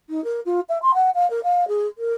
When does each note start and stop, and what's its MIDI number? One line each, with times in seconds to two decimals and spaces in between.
0.09 0.23 63
0.24 0.41 70
0.46 0.60 65
0.69 0.81 76
0.82 0.92 84
0.94 1.10 78
1.15 1.29 77
1.30 1.40 70
1.44 1.68 77
1.68 1.87 68
1.98 2.14 70